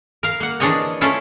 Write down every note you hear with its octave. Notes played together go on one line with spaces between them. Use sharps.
A#4 F5
A#3 F#5
E3 D4 G#4 C#5 D#5 A#5
A3 C#4 E4 F4